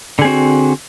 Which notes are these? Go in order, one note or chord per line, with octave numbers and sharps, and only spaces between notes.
D3 C4 F#4 G#4